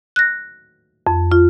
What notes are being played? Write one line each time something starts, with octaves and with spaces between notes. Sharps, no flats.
F#6 A#6
F2
F4